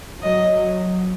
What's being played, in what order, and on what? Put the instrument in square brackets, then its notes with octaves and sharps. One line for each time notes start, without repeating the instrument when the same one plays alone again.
[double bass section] F#3 [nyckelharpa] D#5